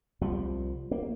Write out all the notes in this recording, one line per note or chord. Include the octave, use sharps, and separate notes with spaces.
C2 F3 G3
A#3